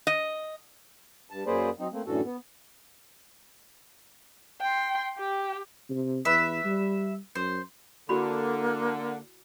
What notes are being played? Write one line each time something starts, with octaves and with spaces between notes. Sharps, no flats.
D#5
G2 A5
F#2 A#3 G#4 B4 C5 D5
F#3 C4 D#4
A3 A#3 C4
F#2 A2 D3 E3 F#4 A4
B3
G5 C6
G4 G5
C3
E2 B4 E5
G3
F#2 C5
D3 A#3 E4 F#4 B5